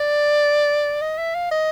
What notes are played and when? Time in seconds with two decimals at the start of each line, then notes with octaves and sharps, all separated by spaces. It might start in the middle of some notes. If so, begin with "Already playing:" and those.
Already playing: D5
1.02 D#5
1.18 E5
1.35 F5
1.51 D#5